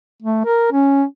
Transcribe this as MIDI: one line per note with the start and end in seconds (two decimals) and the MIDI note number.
0.22 0.44 57
0.46 0.71 70
0.72 1.04 61